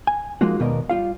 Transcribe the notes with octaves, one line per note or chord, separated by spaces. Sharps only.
G#5
F3 G#3 A#3 D#4 F4 F#4
D#2 B2 B3 A#4 D5 D#5
G3 F4 F5